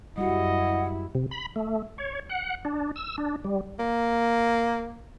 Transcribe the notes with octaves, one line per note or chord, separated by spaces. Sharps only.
F#2 G3 E4 F#4 D#5 F#5
C3
B5
A3
C#5
F#5
D4
E6
D4
G3
A#3